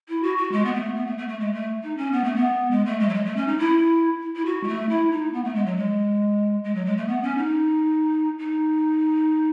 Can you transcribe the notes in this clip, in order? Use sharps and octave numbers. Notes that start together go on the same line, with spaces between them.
E4
F#4
F#4
G#3
B3
A3
B3
A3
A3
A3
G#3
A3
D#4
C#4
B3
A3
B3
G#3
A3
G#3
F#3
G#3
A3
C#4
D#4
E4
E4
F#4
G#3
A3
E4
D#4
B3
A3
G#3
F#3
G#3
G#3
F#3
G#3
A3
B3
C#4
D#4
D#4